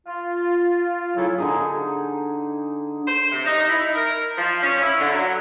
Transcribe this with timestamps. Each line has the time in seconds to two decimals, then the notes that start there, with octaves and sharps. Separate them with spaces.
0.06 F4
1.16 A2 C#3 F#3 E4 A4 C#5
1.38 D3 D#4 G#4
3.07 C5
3.32 C3
3.46 D#4
3.69 E4
3.95 A#4
4.36 F3
4.63 C#4
4.81 E4
4.99 D3
5.12 F#3